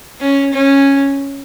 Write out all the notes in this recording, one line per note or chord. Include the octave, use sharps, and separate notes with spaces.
C#4
C#4